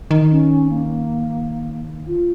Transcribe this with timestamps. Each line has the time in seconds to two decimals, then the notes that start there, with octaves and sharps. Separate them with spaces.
0.11 D#3
0.30 C#4
0.69 A#3
2.06 F4